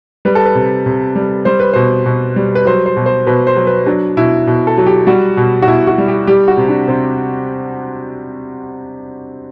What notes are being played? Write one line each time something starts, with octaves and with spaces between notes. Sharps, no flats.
G3 B4
A4
B4
C3
C3
G3
G3 C5
B4
B2 C5
B2
G3
B4
F#3 C5
C5
B2
C5
B2 B4
C5
F#3
B4
F#3 D4
B2 E4
B2
A4
F#3
G4
G3 F#4
B2
F#4
B2 E4
F#4
G3
G4
G3 G4
F#4
C3
D4
C3 C4